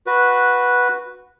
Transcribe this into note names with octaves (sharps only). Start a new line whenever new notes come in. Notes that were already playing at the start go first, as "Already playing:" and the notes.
F#4 B4